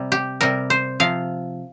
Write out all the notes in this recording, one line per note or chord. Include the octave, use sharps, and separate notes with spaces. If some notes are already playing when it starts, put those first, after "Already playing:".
Already playing: C3 G3
G4
C3 G3 A#4
C5
C3 F3 F5